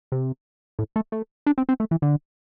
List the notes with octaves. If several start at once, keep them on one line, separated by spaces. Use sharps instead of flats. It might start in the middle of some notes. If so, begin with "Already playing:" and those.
C3
A2
A3
A3
D4
C4
C4
A3
E3
D3